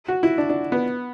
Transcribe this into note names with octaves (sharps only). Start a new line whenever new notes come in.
F#4
E4
D4
D4
B3